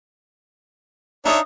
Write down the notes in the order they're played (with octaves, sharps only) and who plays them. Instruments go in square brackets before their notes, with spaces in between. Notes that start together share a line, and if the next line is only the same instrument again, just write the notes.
[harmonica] D4 C#5 E5 [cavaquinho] D#4 D#5 D#6